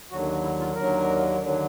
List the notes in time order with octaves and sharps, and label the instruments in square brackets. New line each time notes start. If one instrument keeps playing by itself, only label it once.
[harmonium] D#2 D3 F#3 F#4
E4
F4
D#2 D3 F#3 A#4
D#2 D3 F#3